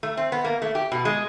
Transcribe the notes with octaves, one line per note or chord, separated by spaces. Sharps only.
A3
C4
B3
A#3
A3
G4
B2
G#3